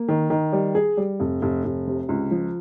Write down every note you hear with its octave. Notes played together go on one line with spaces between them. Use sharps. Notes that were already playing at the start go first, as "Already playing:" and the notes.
Already playing: A#3
D#3
D#3
G3
G#4
G3
F1
F1
F1
C3
C#2
F3